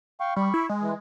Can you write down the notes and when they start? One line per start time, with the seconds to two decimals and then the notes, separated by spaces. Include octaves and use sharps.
0.20 F5 G5 C#6
0.36 G3 B5 C#6
0.54 E4
0.69 G#3
0.81 E3